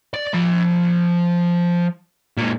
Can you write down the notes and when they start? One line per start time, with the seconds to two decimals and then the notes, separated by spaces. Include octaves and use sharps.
0.14 D5
0.33 F3 B5
2.37 A#2 G#3